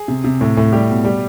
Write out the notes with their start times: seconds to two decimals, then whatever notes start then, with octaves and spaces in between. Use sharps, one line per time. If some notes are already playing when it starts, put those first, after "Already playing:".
Already playing: G#4
0.08 C3
0.24 C3
0.41 A2
0.57 A2
0.72 G3 G4
0.89 B2
1.05 G3